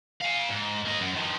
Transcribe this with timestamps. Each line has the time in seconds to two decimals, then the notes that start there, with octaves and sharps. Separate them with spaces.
0.22 F5 G#5
0.50 G#2
0.87 A#3 D#5
1.01 F#2
1.15 D#3 F3